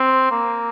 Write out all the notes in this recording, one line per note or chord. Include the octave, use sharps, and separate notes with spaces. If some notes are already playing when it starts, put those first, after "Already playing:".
Already playing: C4
A#3